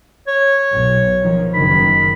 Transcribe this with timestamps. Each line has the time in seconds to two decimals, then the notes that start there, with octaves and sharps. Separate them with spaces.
0.27 C#5
0.73 B1
1.22 D#3 F3
1.54 F#1 D#3 B5